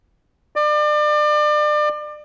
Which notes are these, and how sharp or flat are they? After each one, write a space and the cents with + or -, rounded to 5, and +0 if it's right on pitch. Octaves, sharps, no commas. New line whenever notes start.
D5 +35